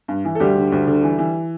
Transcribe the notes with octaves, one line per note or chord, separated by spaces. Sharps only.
G2
E3
A4
D2 G3 G4
D3
D2
D3
E3
E3